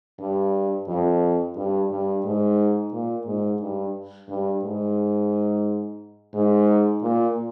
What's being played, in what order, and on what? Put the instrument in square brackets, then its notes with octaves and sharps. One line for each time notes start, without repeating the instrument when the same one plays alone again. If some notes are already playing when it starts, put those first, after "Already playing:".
[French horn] G2
F2
G2
G2
G#2
A#2
G#2
G2
G2
G#2
G#2
A#2